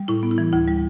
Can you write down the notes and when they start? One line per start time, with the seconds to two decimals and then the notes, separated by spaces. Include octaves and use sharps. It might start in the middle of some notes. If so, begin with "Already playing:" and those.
Already playing: G3
0.08 A2 E4
0.23 B3
0.31 E4
0.38 E3
0.53 D2 E4
0.68 G3